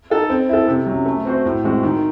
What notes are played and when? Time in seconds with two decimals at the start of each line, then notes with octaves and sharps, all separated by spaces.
0.10 D#4 A4 D#5
0.29 C4
0.49 E4 A4
0.68 C3
0.86 F#3 C#4
1.06 A3
1.25 C4 F#4 C5
1.45 A2
1.64 G#3 C4 F#4
1.83 D#3